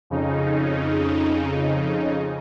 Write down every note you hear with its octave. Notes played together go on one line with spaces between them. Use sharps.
F2 C#3 D#4